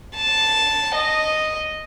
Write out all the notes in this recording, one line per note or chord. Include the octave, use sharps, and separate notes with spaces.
A5
D#5